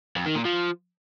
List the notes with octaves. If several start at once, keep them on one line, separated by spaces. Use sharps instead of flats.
F2
D#3
A#2
F3